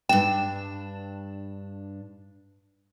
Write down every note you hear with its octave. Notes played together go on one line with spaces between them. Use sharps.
G2 D4 G5 E7